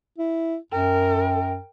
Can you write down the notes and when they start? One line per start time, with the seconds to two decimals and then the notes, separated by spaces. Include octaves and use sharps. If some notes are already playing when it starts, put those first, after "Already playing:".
0.18 E4
0.72 F#2 A#4 G5